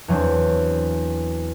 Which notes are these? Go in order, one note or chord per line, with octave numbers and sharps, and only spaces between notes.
E2 F#3 C4 D4